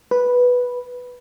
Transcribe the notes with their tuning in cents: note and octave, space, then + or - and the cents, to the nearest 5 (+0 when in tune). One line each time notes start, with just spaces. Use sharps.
B4 -5